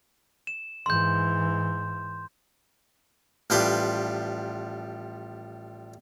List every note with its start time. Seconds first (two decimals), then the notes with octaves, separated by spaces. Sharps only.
0.47 E7
0.86 G#2 E3 C6 G6
3.50 A1 F3 G3 B4 C6 D6